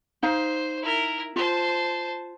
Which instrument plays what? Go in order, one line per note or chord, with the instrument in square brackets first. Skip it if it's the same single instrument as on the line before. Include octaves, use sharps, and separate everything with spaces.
[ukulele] D#4 F5 [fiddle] C5
[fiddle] E4 A#4
[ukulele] F4 [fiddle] C5 A5